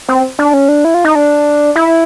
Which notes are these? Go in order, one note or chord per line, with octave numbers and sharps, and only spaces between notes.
C4
D4
C#4
D4
E4
F4
D#4
D4
E4